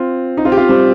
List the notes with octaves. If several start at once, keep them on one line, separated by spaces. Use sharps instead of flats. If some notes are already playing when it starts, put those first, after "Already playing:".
Already playing: C4 F4
D#4
C4 F4
G4
C4 F4
G3 C4